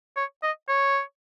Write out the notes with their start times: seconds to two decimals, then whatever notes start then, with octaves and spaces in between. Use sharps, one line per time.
0.16 C#5
0.43 D#5
0.69 C#5